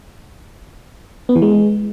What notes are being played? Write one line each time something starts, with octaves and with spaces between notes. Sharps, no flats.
B3
E3
G#3